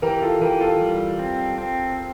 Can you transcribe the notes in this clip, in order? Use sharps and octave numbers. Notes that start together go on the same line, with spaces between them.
E3 G4 A#4
F4 A4
E3 G4 A#4
F4 A4
G3
C4
C4